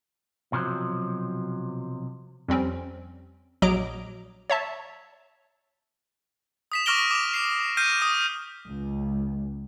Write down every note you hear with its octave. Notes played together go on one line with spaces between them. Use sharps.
B1 C3 F3 F#3
F2 G3 C4 C#4
A#1 F#3 D#5 A#5 D6 D7
C#5 E5 A5
D#6 B6 E7
C#6 D6 F6 A#6 D7 G7
D6 F7
C7
F6 G6 A#6 C7 D#7
D#6
C#2